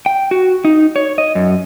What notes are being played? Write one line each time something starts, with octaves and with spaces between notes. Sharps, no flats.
G5
F#4
D#4
C#5
D#5
F#2